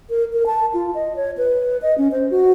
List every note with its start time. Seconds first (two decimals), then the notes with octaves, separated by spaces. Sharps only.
0.10 A#4
0.33 A#4
0.46 A5
0.74 F4
0.95 D#5
1.16 C#5
1.38 B4
1.82 D#5
1.98 C#4
2.12 C5
2.30 F#4